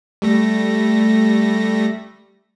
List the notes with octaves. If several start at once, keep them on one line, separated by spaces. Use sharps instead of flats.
G3 A3 A#6